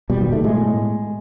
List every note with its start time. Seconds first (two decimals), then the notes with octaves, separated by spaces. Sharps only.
0.10 B2 G3
0.21 D#3
0.32 A3
0.44 A2 G#3